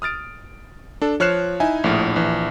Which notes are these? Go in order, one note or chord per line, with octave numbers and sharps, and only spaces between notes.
D#6 F6 A6 D7
D4 A4
F3 C#5 F6 F#6 C7 E7
D#4 E4 E5 G#5
A#1 A2 F6
A#1 E3